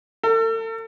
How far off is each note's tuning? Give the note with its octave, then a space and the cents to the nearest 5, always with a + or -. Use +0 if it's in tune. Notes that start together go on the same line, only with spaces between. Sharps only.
A4 +40